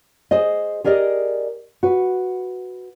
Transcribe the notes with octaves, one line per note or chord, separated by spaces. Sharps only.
G#4 C5 D#5
G4 G#4 A#4 D5 D#5
F#4 B4